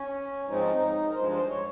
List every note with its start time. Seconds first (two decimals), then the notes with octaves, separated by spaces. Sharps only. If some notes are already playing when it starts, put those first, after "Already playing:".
Already playing: C#4
0.47 G#2 F3 G#3 C4 D#4
1.10 A#4
1.15 G2 F3 G#3 C5
1.32 C5
1.49 C#5